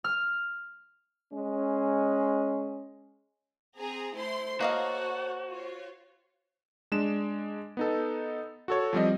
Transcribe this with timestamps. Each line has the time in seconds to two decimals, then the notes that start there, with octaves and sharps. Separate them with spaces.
0.04 F6
1.33 G#3 C#4
3.77 C4 G#4 A#5
4.15 A3 E4 C5 C6
4.61 A#3 F#4 A4 C#5 D#5 F5 F#5
5.49 F4 C#5
6.92 G#3 D4 E7
7.77 B3 D#4 A4
8.68 F#4 A4 C#5
8.93 F3 G3 C4 D#5